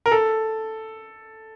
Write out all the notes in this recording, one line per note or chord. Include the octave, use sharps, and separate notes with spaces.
A#4
A4